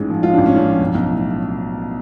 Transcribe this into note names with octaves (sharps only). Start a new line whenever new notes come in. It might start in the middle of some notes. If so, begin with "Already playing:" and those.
Already playing: A1 G#2 G#3
F3
G#3 F4
A1 D4
C#4
G#2 D4
F3
B1
B1
A2